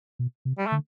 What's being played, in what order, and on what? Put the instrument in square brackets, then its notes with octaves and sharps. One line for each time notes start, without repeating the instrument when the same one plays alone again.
[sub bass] B2
C3
[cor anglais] G3
A3
[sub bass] D3